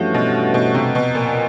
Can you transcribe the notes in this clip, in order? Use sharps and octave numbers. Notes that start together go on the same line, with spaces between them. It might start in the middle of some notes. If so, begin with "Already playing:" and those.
Already playing: G2 E3 F3 A3 C#4 F#4
B2
B2
C3
B2
A#2